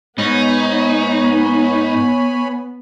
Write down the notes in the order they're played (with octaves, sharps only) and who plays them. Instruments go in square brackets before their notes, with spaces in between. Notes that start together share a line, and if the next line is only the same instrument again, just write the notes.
[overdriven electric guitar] G#2 [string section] B3 [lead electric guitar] D#4 [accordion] C#5 G#5 B5